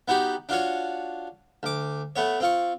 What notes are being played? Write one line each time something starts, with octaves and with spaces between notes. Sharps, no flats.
B3 D#4 F#4 G4 B5
D4 F4 F#4 C#5
D2 D6
A3 B3 C#5
C4 F4 C#6